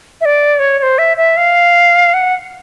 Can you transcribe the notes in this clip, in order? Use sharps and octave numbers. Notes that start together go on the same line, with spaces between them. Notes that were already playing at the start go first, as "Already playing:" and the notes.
E5
D5
C#5
C#5
C5
E5
E5
F5
F#5